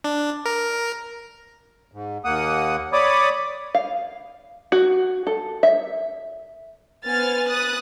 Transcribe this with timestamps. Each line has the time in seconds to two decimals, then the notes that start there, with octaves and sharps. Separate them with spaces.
0.04 D4
0.46 A#4
1.92 G#2
2.24 D#2 A#3 F#5 D#6
2.93 C#5 D5 B5 D6 D#6
3.75 F5
4.72 F#4
5.27 A4
5.63 E5
7.07 B3 C5 G#5 F6 A6
7.48 B4 D#6 F#6 A6